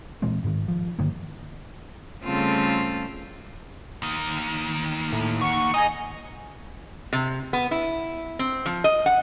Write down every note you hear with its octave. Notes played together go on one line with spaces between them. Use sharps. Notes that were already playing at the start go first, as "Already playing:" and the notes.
A#2 E3 G#3 C4
G#2 D#3
F3
G2 D3 D#3 A#3
C#3 G3 A3 C4 F4 A4
D#2 D#3
A2
F#5 C#6
D#4 D#5 G#5
C3
B3
E4
C4
F3
D#5
F#5